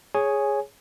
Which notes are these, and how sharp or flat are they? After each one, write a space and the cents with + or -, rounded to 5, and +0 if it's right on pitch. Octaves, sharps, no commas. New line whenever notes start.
G#4 +0 C#5 +0 G#5 +0